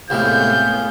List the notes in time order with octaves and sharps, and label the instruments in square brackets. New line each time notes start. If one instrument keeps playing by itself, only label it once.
[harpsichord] C2 A2 G#3 [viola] A3 B3 [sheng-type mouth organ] G#4 F5 [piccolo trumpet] G6